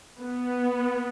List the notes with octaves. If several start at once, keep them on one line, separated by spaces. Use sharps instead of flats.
B3